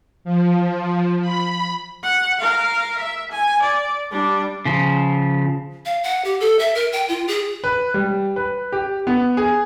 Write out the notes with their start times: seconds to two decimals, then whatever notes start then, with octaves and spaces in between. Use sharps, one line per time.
0.25 F3
1.21 B5
2.03 F#5
2.40 A#4 F5
2.98 E5
3.31 G#5
3.61 D5
4.11 G3 D4
4.65 C#3 F3
5.85 F5
6.03 F#5
6.25 G4
6.40 A4
6.59 E5
6.75 A#4
6.92 G5
7.08 F4
7.28 G#4
7.64 B4
7.94 G3
8.36 B4
8.72 G4
9.07 B3
9.37 G#4